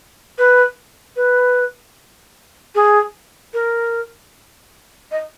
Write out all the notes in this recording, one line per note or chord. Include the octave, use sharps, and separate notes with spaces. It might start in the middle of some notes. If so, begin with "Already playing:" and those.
B4
B4
G#4
A#4
D#5